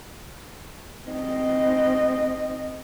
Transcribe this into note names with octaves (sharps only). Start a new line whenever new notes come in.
C4 D#5